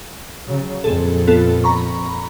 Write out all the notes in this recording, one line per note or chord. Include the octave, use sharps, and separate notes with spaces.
C#3 F#3
F2 A#2 G#4 A4
B3 F4 A4
A#5 B5 C#6